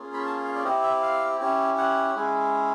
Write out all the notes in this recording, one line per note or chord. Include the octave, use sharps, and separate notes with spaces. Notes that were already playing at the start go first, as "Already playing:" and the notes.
Already playing: A#3 C#4 F4 G#4
B5
A5
F5
D5
C4 E4 G4 D#5
E5
F5
C#4 E4 G4
F#5
G#3 C#4 E4 G#4